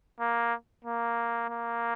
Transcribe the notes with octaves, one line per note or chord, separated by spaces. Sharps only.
A#3
A#3
A#3